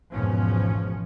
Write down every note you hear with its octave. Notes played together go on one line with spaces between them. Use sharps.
G#1 E2 B2 F3 C#4